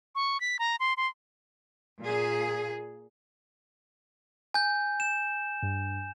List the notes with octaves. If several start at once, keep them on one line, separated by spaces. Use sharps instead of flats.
C#6
B6
A#5
C6
C6
A#2 G#4
G#5 G6
E7
G2